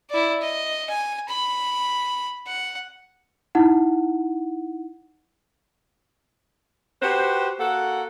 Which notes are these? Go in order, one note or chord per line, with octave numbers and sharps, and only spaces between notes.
E4 D5
D#5
G#5
B5
F#5
D#4 E4 F#5
F#4 G4 B4 C5
A#3 F#4 A4 F#5